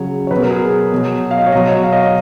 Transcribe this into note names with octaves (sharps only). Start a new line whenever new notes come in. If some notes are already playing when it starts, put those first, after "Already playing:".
Already playing: C#3 F#3 C#5
C#5
B2 F#3 B4
A#4
G#4
B2 F#3
F5
D#5
C#5
B2 F#3 D#5
C#5
F5
D#5
D#5